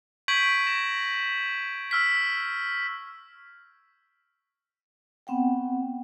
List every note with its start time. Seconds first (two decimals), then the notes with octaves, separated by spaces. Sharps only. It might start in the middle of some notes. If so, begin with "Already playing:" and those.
0.28 C#6 G6 G#6 B6 D7 F#7
0.67 A#6 E7
1.91 E6 F6 B6
5.27 B3 C4 F#5 G5